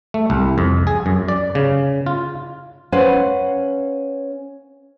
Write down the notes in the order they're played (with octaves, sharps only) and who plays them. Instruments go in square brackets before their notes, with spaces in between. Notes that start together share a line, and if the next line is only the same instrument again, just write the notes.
[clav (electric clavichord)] A3
C2
F2
G#4
F#2
D5
C#3
F4
[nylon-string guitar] C#4 B4 C5 F5 F#5